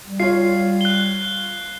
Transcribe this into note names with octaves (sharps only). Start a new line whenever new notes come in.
G3
F4 C#5 C7
F#6 G7